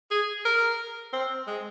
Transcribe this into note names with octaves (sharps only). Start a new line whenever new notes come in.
G#4
A#4
C4
G#3